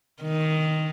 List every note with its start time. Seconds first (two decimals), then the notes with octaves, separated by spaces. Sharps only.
0.23 D#3